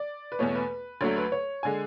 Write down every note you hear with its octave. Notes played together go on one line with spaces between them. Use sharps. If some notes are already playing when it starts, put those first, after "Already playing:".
Already playing: D5
B4
E2 B2 A3 C#5
B4
D2 D3 F#3 A3 C#5
B4
C#5
D3 G#3 G#5